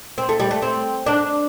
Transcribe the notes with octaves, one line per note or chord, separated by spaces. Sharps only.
C4
A3
G3
A3
C4
D4